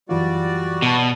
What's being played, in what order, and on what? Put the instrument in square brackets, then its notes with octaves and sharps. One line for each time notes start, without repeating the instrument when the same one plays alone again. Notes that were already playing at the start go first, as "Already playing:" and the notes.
[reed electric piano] F#2 E3 F4 [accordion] G3 F#4 D5
[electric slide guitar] B2 [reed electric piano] F#5 A5